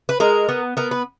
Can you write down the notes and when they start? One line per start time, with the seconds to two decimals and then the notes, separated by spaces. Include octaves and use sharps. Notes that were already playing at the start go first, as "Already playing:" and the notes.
0.09 B4
0.20 G#3 A#4
0.49 B3
0.77 B3 A#4
0.91 B4